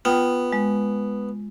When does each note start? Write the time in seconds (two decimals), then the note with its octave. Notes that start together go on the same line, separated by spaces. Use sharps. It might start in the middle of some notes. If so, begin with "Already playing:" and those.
0.05 B3 F4 G5 D#6
0.53 G#3